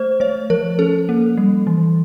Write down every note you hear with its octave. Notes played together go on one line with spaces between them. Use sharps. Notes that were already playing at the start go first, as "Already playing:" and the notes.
Already playing: A3 C5
A3 C#5
F3 A#4
C#4 A4
A#3
G3
E3